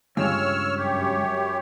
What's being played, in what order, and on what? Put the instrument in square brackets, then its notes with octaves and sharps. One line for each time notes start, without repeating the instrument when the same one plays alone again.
[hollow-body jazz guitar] C#2 G2 [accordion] C#5 E6 F6
[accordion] F#2 G4 C#5